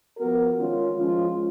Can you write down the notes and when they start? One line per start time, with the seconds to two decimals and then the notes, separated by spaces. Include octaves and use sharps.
0.18 F3 B3 F#4 A#4
0.57 D#3 G#3 C#4 F4
0.96 F3 G#3 C#4 F4